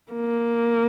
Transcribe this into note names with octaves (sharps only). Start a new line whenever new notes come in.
A#3